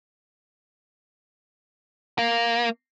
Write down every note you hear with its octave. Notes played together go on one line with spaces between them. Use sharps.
A#3